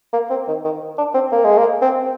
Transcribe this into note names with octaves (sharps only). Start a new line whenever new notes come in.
A#3
C4
D#3
D#3
D4
C4
A#3
G#3
A#3
C4